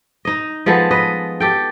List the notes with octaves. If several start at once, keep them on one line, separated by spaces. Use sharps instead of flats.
D#4 D#5
F3 G#3 B3 A4
B4 D#5
G4 A4 G5